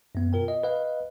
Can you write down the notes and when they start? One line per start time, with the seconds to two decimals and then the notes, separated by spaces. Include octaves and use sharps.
0.15 F#2 B3
0.33 B2 F4 A#4 G5
0.48 D#5
0.63 B4 D#5 F5